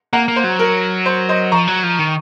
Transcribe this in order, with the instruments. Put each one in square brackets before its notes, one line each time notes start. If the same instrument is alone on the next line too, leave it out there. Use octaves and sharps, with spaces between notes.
[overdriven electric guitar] A#3 [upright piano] F#5 A#5
[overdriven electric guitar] A#3
[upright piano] C5
[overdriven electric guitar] F#3
[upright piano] A#4
C5
C5 D#5
[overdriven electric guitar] F3 [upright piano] A#5 C#6
[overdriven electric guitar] F#3
F3
D#3